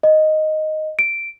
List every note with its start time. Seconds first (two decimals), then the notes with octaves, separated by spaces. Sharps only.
0.03 D#5
0.99 D7